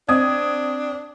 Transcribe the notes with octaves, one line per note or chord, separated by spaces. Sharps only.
C4 D4 D#6 G#6